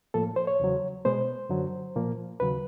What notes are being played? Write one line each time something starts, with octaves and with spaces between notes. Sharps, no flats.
A2 F3 A#3 A4
C5
C#5
E2 C#3 F#3
B2 G#3 B3 C5
F#2 D3 F#3
A#2 F3 A#3
D#2 C#3 F#3 B4